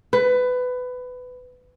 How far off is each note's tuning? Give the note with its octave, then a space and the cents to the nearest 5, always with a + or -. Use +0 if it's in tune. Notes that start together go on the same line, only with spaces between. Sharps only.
B4 +20